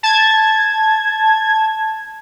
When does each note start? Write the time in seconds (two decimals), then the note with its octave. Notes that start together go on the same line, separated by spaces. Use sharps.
0.03 A5 G#6